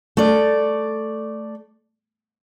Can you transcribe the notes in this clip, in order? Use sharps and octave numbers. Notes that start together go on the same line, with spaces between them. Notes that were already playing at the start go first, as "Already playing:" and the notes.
A3 D5